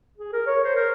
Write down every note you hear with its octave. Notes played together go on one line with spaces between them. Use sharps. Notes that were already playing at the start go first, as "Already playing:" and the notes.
G#4
A#4
C#5
C5
A#4